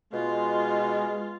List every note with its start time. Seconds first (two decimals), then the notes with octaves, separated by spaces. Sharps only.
0.13 B2 G#3 F4